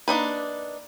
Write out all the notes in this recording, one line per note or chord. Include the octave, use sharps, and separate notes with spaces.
A#3 D4 D#4 B4